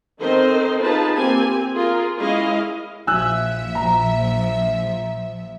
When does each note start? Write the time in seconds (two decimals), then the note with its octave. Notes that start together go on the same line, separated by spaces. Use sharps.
0.19 D#3 C4 A4 A#4 C5 D#5
0.81 D#4 F4 G#4 B4 A5
1.15 A#3 C4 G4 G#5
1.74 F4 G#4 A#4
2.18 G#3 C#4 E4 G#4 D#5 F5
3.07 A#1 F3 E5 G#5 E6 F#6
3.75 A#5